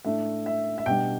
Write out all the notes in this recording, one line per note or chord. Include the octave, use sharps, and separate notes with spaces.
A2 A3 D4 E5
E5
E5
B2 G3 D4 G5